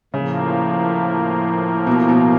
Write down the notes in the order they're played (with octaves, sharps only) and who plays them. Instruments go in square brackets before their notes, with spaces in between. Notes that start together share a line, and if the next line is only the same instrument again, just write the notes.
[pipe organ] A2 F3 A#3 [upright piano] C#3
[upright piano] B2
B2